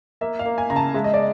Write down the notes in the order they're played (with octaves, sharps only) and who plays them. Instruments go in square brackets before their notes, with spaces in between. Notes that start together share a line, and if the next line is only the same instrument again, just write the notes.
[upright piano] A#3 E5
F5
A#3
G#5
C#3 A#5
A5
G#3 E5
D#5
D5